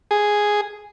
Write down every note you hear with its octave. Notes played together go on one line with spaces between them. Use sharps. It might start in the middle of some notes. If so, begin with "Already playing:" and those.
G#4